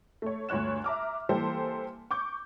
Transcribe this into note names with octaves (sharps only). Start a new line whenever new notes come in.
A3 C#5
D2 G2 C#5 F#6 E7
E5 A#5 D6 F6
E3 G3 A#3 G4 A4 C5
C#6 D6 G6